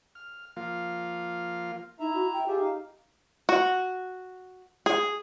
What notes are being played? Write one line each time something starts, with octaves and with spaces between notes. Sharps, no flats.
F6
F3 A#3 F4 F5
D#4 E4 E5 A#5
F#4
G5
F4 G4 G#4 E5
D#4 F5
F#4
G#4